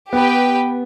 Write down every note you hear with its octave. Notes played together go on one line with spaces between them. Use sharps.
B3 G4 B4 G5